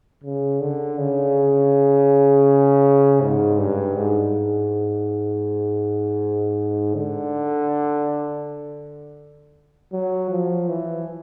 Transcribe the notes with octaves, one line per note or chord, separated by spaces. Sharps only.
C#3
D3
C#3
G#2
G2
G#2
D3
F#3
F3
E3